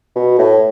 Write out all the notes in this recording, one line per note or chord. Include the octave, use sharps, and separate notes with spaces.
B2
A2